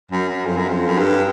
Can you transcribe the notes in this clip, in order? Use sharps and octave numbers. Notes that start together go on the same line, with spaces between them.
F#2
F#2
F2
F#2
F2
F#2
G2